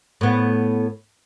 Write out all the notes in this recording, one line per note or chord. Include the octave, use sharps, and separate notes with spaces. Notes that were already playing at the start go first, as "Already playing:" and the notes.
A2 B3